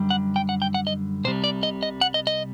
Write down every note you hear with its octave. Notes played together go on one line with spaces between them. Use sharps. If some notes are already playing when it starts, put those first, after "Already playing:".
Already playing: F#2 D3 G3
F#5
G5
F#5
G5
F#5
D#5
C2 C3 G3 C5
D5
D#5
D#5
F#5
D#5
D#5